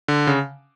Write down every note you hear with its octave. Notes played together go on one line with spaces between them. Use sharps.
D3
C#3